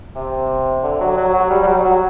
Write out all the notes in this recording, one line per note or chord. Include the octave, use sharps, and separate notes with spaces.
C3
D3
F#3
F#3
F#3
G3
G3
F#3
F#3